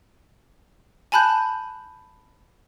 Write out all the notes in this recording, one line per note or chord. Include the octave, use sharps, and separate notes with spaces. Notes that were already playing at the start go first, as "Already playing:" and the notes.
G#5 A5 B5 F#6 G6